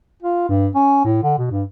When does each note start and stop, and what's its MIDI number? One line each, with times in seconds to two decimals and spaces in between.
0.23 0.44 65
0.49 0.68 43
0.75 1.02 61
1.04 1.22 45
1.23 1.37 50
1.38 1.46 47
1.51 1.64 43